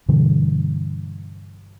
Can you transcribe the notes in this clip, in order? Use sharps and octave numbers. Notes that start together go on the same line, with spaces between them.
G2 B2 D3 E3